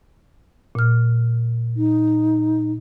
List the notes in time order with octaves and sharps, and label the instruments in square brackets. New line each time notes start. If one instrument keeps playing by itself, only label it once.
[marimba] A#2 F6
[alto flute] D#4